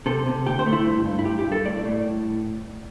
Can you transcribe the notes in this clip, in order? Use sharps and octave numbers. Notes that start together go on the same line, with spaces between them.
C3 A4
C3
D2 G4
C5
A3
E4
G2
G2
E4
G2 G4
G4
G2
A4
A2 D5
A2